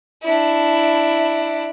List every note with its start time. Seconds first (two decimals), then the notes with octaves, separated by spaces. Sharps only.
0.23 D4 E4